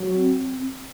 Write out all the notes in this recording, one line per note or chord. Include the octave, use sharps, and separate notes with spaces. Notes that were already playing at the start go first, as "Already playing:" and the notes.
Already playing: F#3
C4